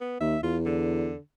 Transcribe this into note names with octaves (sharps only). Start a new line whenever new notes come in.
B3
D#2 E5
E2 F4
D3